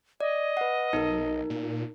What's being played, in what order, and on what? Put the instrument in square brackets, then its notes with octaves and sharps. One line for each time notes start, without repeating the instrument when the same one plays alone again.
[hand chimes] D5 [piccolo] D#5
[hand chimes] B4 F#5
[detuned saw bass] B1 [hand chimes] D#4 A#4
[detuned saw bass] A#2